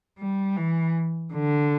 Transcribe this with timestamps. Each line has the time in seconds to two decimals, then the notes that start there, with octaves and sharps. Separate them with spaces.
0.19 G3
0.57 E3
1.34 D3